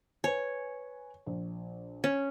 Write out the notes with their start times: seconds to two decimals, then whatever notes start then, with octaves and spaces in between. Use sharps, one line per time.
0.24 B4 C#5 G#5
1.26 A#1
2.04 C#4